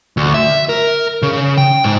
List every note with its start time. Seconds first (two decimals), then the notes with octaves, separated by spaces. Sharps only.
0.17 D2
0.34 E5
0.69 A#4
1.22 C#3
1.58 G5
1.84 G#2